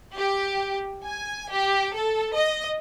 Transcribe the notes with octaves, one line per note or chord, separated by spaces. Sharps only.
G4
G#5
G4
A4
D#5